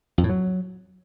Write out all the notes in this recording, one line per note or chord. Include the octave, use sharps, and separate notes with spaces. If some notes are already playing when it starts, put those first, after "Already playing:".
F2
A2
F#3